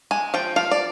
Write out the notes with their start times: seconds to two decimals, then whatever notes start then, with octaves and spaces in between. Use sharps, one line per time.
0.11 G#3 G#5
0.34 F3 G5
0.56 F3 F5
0.71 D5